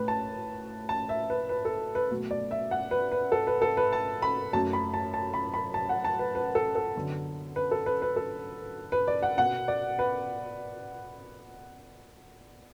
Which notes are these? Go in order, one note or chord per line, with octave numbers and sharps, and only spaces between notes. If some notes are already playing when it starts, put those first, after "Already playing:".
Already playing: A2 A3 B4
A5
A5
E5
B4
B4
A4
B4
B2 F#3 A3
D5
E5
F#5
B4
B4
A4
B4
A4
B4
A5
B5
F#2 F#3 A3 A5
B5
A5
A5
B5
B5
A5
F#5
A5
B4
B4
A4
A4
F#2 D3 B3
B4
A4
B4
B4
A4
B4
D5
F#5
B2 B3 F#5
D5
B4